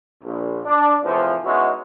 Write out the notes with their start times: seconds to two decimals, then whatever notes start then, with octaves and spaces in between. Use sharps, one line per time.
0.24 A#1
0.65 D4
1.04 E2 A2 C3 E3 F3
1.45 G#3 B3 C#4 D#4 E4 F#4